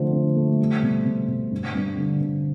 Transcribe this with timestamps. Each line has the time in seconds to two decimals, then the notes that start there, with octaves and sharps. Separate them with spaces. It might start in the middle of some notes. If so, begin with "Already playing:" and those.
Already playing: D3 F3 A3 C5
0.12 D3
0.36 A3
0.58 G3
0.83 B2
1.05 B2
1.28 B2
1.51 G2
1.75 G2
1.97 D3
2.21 D3